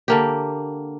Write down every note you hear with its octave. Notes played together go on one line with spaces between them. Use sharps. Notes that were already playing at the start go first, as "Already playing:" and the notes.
D3 A#3 G4